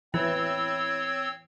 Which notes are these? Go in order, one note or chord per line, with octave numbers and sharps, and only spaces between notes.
E3 C4 E4 C#5 E6